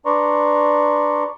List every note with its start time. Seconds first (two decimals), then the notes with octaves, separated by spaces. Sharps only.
0.06 D4 B4 D5 A#5 C6 C#6